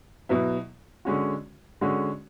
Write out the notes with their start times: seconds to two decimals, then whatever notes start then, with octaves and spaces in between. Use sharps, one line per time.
0.29 B2 F#3 B3 E4
1.05 D3 G#3 C#4 F#4
1.81 D3 G#3 C#4 F#4